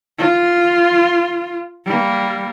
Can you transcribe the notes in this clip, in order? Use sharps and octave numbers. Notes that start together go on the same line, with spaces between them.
F4
G3 A#3